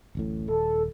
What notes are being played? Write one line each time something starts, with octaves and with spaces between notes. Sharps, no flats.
D1 A1 A2
D#1 A4